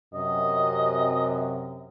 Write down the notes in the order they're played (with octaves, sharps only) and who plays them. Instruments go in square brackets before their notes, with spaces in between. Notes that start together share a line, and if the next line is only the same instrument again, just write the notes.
[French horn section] F#2 C3 [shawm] D#5